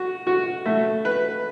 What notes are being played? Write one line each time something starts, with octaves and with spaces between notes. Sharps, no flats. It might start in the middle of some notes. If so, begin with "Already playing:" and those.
Already playing: F#4
F#4
A3
B4